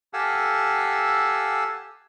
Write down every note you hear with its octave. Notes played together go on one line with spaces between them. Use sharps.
G4 A4 F5 F#5 G#5 E6